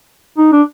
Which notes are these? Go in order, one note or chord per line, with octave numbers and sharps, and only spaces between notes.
D#4
D4